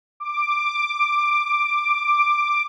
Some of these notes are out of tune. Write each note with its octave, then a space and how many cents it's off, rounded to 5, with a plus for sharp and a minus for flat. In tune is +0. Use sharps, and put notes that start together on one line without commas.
D6 +10